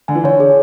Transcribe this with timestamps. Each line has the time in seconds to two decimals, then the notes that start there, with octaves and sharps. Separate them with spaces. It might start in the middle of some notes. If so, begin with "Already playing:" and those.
0.08 D3 G#5
0.15 E3
0.23 D3 C#5
0.40 G#4